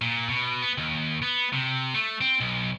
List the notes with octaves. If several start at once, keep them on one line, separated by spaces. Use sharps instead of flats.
A#2
B2
B3
D#2
B3
C3
A3
C4
B1